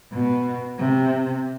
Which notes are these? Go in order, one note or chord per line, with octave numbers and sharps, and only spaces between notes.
B2
C3